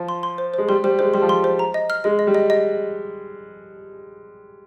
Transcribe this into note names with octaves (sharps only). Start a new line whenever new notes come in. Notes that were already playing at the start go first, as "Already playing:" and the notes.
Already playing: F3
C6
C6
C5
G#3 C5
G3 C6
G3 C5
G#3 C5
G3 C6
F3
G3 C6
C5
A#5
D#5
F6
G#3 D#5
D#5
G3
D#5
D#5